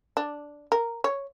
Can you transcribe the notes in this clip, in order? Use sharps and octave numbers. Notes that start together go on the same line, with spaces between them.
D4
A#4
C#5